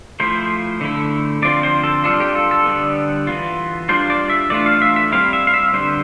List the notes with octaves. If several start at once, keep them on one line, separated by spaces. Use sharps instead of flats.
F3 A3 E4 C5
D3 A3 E4
D3 F3 C4 F4 D5
C5
A4
G3 D4 F4 A4
G4
A4
A4
D3 G3 B3
E3 B3 F4
G3 D4 F4 C5
D5
E5
E3 A3 D4 F4 D5
F5
E5
E5
G3 C4 E4 F5
E5
F5
E5
D3 G3 B3 C5